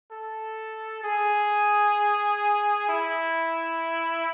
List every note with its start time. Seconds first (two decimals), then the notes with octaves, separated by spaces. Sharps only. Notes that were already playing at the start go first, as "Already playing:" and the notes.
0.12 A4
1.04 G#4
2.89 E4